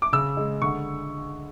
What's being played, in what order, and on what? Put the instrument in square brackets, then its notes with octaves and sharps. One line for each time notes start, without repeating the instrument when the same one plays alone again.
[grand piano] D6
C#3 E6
G#3
D3 C#6